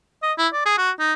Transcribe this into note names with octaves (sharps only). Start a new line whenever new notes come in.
D#5
E4
D5
G#4
F#4
D#4